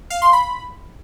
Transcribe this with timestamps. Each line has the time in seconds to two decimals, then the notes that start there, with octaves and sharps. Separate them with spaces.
0.10 F5
0.22 C6
0.33 B5